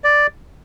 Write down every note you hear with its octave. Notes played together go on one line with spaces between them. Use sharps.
D5